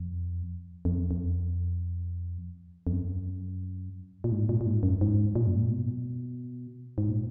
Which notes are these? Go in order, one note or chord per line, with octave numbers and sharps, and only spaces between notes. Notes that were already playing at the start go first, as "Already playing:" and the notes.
Already playing: F2
F2
F2
F2
F#2
A#2
G#2
A#2
A#2
G#2
F#2
G#2
A#2
F#2
G#2
A#2
B2
G#2
A#2